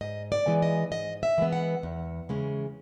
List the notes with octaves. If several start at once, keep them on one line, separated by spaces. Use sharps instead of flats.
G#2 D#5
D5
E3 G#3 B3
D#5
G#2 D#5
E5
E3 G#3 B3
F#5
E2
C#3 E3 G#3 C#4